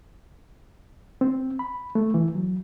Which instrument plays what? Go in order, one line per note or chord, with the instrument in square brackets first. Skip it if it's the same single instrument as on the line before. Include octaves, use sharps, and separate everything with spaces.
[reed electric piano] C4
B5
A3
E3
F#3